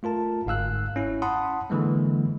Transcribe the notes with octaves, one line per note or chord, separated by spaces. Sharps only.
A3 F4 A#4 A5
G1 G#2 F5 E6 F#6
C#4 E4
F#5 A5 B5 C6 D#6
D3 E3 G#3 A#3